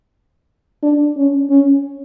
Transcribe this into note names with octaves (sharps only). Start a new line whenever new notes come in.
D4
C#4
C#4